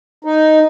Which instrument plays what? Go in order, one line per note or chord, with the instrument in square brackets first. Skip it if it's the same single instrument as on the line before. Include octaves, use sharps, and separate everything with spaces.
[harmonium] D#4